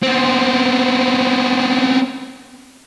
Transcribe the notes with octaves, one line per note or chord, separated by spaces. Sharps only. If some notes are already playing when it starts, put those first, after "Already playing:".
B3 C4